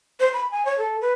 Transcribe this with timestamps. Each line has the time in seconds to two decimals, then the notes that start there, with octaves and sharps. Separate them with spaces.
0.20 C5
0.33 B5
0.51 G#5
0.65 C#5
0.78 A4
1.01 B4